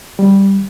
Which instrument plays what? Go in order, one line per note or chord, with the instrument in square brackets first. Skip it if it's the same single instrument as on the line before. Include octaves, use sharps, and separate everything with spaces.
[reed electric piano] G3